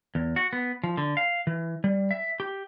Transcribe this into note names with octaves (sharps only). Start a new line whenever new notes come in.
E2
F#4
B3
F3
D3
F5
E3
G3
E5
G4